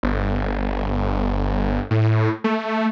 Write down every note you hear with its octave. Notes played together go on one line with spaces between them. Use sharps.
G1
A2
A3